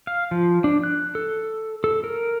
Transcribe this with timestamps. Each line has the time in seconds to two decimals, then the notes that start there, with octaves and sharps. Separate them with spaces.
0.07 F5
0.31 F3
0.64 D4
0.83 F#6
1.15 A4
1.84 A4
2.04 A#4